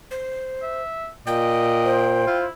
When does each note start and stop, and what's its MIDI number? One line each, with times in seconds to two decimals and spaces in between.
0.11 0.82 72
0.62 1.09 76
1.27 2.23 46
1.27 2.17 75
1.27 2.37 79
1.85 2.45 72
2.27 2.51 64
2.27 2.45 65